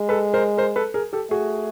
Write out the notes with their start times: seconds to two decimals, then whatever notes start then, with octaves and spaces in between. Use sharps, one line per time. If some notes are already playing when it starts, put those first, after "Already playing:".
Already playing: G#3
0.09 A4 B4
0.34 A#4 C5
0.58 A#4 C5
0.76 A4 B4
0.94 G#4 A#4
1.13 G4 A4
1.30 A3 F#4 G#4